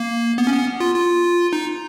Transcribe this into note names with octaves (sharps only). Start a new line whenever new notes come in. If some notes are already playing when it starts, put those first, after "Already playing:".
Already playing: A#3
B3
C#4
B3
F4
F4
D#4